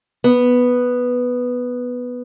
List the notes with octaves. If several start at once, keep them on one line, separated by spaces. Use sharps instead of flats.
B3